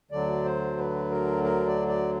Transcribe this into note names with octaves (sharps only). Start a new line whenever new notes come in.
D2 D3 F#3 D5
C5
B4
A#4
A#4
D5
D5